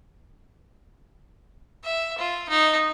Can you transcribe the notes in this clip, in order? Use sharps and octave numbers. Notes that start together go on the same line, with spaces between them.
E5
F4
D#4